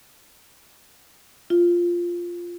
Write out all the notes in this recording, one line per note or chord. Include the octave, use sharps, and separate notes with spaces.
F4